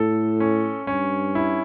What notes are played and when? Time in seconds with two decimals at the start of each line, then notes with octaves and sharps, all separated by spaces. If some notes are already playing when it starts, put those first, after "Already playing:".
Already playing: A2 A4
0.40 C#4
0.87 G2 C#4
1.35 E4